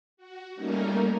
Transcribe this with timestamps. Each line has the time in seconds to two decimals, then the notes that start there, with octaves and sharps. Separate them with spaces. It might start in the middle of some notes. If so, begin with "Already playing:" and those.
0.17 F#4
0.56 G3 A3 A#3 C#4 D#4 A#4